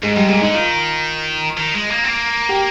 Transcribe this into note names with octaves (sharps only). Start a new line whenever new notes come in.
G#2 G#3
G#2 G3
A#2 G#3
D3 D#4
D#3 F4
D#3
G#3
A#3
C4
A#3
G4